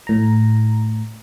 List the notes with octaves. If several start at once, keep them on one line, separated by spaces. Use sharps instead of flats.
A2 A#5